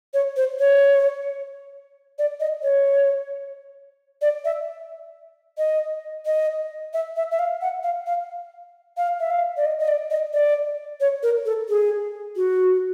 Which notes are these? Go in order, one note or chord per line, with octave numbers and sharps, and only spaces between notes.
C#5
C5
C#5
D5
D#5
C#5
D5
E5
D#5
D#5
E5
E5
E5
F5
F#5
F5
F5
F5
E5
F5
D5
D#5
D#5
D5
D#5
D5
C#5
A#4
A4
G#4
F#4